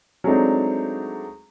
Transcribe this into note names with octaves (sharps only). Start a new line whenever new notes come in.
F#3 G#3 A3 C4 D4 D#4